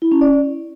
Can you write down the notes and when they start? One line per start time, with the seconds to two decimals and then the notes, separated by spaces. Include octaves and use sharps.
0.02 E4
0.12 C#4
0.21 D5